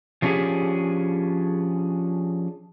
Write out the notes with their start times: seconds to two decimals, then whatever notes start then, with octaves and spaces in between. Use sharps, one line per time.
0.22 F3 G#3 C#4 D4 G4 G#4